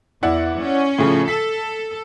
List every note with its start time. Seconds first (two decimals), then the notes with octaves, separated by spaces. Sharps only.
0.23 E2 E4 D5 F#5
0.59 C#4
0.99 A2 C#3 F3
1.28 A4 B6